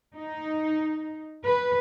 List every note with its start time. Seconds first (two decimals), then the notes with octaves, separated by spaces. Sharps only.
0.14 D#4
1.45 B4